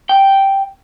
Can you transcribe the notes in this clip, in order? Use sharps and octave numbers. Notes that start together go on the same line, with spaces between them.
G5